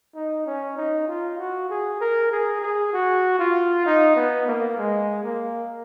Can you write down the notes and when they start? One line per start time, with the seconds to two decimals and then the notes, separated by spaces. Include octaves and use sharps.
0.15 D#4
0.46 C#4
0.77 D#4
1.08 F4
1.38 F#4
1.70 G#4
2.01 A#4
2.31 G#4
2.61 G#4
2.93 F#4
3.39 F4
3.86 D#4
4.16 B3
4.47 A#3
4.78 G#3
5.24 A#3